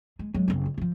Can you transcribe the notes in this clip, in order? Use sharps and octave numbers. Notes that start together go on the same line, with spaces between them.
G#3
F#3 G#3
F#1 C4
C#2
E3 F3